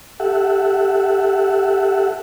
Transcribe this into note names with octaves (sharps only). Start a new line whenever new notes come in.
G4 A4 E5 F#5